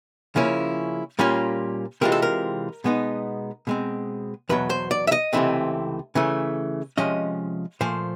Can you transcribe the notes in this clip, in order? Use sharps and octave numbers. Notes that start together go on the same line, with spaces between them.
C#3 F3 A#3 C#4 E4
A#2 G3 A#3 C#4 F4
C3 E3 G#3 C4 F4 A#4
A4
A#4
B2 G#3 B3 D#4
B2 G#3 C4
E2 B2 F#3 B4
C5
D5
E5
D#5
C#2 C3 E3 A3 C4
C#3 E3 A3
C3 F3 G#3 C#4 D#5
A#2 F3 A3 C5